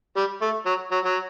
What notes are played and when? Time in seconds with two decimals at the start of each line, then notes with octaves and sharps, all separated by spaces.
0.16 G3
0.42 A3
0.66 F#3
0.91 F#3
1.05 F#3